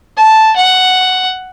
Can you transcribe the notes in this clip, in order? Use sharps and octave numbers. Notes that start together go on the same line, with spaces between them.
A5
F#5